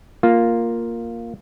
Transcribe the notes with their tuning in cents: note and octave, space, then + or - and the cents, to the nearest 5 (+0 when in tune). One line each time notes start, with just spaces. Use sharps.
A#3 +0 F4 +0